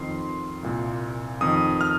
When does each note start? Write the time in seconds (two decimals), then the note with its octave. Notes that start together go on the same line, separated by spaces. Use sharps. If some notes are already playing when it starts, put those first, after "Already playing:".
Already playing: F2 D#3 C6
0.63 C2 A#2
1.41 F2 D#3 D#6
1.81 F6